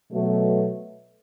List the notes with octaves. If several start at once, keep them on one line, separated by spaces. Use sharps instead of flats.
B2 F#3 A3